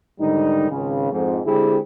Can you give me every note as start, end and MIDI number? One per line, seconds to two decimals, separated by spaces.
0.20 0.71 44
0.20 0.71 50
0.20 0.71 51
0.20 0.71 55
0.20 0.71 63
0.71 1.11 32
0.71 1.11 37
0.71 1.11 49
1.11 1.40 41
1.11 1.40 44
1.46 1.78 50
1.46 1.78 56
1.46 1.78 60
1.46 1.78 64
1.46 1.78 67
1.46 1.78 68